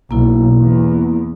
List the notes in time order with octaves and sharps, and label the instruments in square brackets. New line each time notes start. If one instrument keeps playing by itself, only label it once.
[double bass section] B1 [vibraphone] A#3 E4
[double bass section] E2